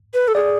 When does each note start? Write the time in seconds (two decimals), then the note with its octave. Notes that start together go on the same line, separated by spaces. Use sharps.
0.14 B4
0.28 A4
0.35 G#4 D5